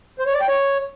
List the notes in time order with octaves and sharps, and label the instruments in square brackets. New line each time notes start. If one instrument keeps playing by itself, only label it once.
[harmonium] C5
C#5
D5
G5
C#5